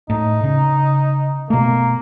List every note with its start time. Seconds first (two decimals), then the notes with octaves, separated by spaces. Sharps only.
0.10 A2 D#4
0.44 C#3
1.50 B2 A3 A#3